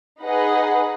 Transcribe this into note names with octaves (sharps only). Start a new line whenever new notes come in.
D#4 G#4 B4 D#5 F#5